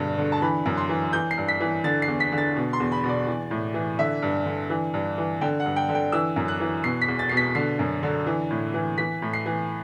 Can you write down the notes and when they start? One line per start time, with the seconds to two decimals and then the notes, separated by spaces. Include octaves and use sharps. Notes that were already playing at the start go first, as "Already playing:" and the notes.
Already playing: E2 G2 B2 D3
0.18 D3
0.32 A5
0.42 E3 B5
0.66 F#2
0.77 C6
0.89 E3
1.13 E3 G6
1.31 C7
1.37 G2
1.48 B6
1.60 E3
1.84 D3 A6
2.02 C7
2.08 E2
2.20 B6
2.32 D3
2.38 A6
2.56 B2
2.73 C6
2.80 E2
2.92 B5
3.04 B2
3.09 D5
3.27 E3
3.51 A2
3.74 E3
3.98 D3 E5
4.22 G2
4.46 D3
4.70 E3
4.94 G2
5.18 E3
5.41 D3 G5
5.60 F#5
5.66 G2
5.76 G5
5.89 D3
5.95 G5
6.12 E3 E6
6.36 F#2
6.48 F#6
6.60 E3
6.83 B2 C7
7.02 B6
7.08 E2
7.19 A6
7.29 B2 C7
7.37 B6
7.55 D3 C7
7.79 F#2
8.03 D3
8.27 E3
8.50 A2
8.74 E3
8.98 E3 B6
9.22 A2
9.33 C7
9.46 E3